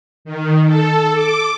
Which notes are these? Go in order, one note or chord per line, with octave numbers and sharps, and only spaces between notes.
D#3
A4
D6